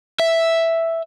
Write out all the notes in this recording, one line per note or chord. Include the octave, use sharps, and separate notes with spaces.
E5